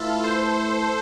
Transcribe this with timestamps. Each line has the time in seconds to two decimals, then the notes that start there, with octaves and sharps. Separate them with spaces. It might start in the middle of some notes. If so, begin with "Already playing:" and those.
Already playing: A3 E4 F4 A4 B4 E5
0.24 A4 C5